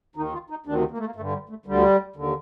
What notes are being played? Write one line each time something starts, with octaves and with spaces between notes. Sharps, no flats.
D#2 D#3 D#4
F4
D#4
D2 C3 D#3 D4
A#3
A3
A#3
G2 D3 A3
G3
A3
D2 D3 G3
D#2 D3